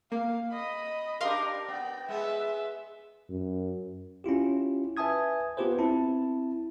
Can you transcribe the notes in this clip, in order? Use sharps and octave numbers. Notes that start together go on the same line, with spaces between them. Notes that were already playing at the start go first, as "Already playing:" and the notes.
A#3 F5
D#5 B5
D4 G4 A#4 F5 C6
B3 G5
G#3 B3 E5
F#2
C#4 E4 F4 G4
B4 E5 G#5 A5 D#6 G#6
B3 F4 G4 B4 C5
C4 E4 A5